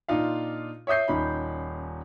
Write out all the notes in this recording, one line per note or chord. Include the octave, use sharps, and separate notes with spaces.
A#2 D4 D#4 F4 F5
C#5 E5 D#6 G6 C7
D#1 C#4 D#4 B5